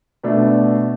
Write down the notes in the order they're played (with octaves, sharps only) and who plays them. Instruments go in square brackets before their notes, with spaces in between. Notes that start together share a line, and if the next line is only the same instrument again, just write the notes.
[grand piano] B2 A3 D4